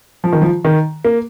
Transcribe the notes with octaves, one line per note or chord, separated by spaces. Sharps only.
F3
D#3
F3
D#3
A#3